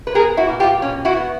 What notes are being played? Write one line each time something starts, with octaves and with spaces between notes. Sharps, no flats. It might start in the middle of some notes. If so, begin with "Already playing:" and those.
B4
B3 G#4 A#4
E4 F#4
A#2
F4 G4
B2 C#4
E4 F#4
B3